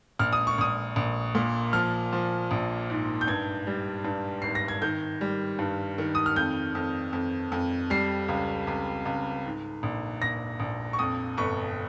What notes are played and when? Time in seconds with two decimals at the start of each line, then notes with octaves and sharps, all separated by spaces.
0.19 A#1 F6
0.33 D#6
0.47 C#6
0.58 A#1 D#6
0.96 A#1
1.35 A#2
1.73 F3 F6
2.13 F3
2.51 A#1
2.90 G#2
3.21 G6
3.27 G2 G#6
3.67 G3
4.04 G2
4.42 G#1 C7
4.55 A#6
4.68 G#6
4.82 D#3 G6
5.21 G3
5.59 G2
5.98 D#3
6.15 D#6
6.26 F6
6.36 F2 G6
6.75 F2
7.13 F2
7.52 F2
7.90 G3 C7
8.28 C#2
8.67 C#2
9.05 C#2
9.45 G#2
9.83 A#1
10.22 A#1 A#6
10.60 A#1
10.93 C#6
10.99 F2 D#6
11.37 G1 C#6